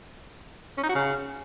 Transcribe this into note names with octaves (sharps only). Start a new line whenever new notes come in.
C#4
D#4
F#4
C#3